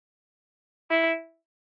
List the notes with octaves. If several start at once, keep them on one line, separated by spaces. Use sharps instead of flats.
E4